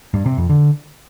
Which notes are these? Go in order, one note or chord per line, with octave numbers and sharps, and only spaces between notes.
G2
C3
F2
D3